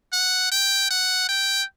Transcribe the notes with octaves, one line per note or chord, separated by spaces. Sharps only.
F#5
G5
F#5
G5